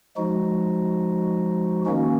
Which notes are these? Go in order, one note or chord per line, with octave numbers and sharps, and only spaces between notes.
F3 G#3 D#4 F#4
D#3 A#3 C#4 F#4